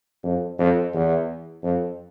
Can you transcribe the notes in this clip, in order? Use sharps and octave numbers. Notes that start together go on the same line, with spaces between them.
F2
F2
E2
F2